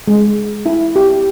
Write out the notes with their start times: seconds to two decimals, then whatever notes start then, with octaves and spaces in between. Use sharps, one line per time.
0.08 G#3
0.66 E4
0.96 G4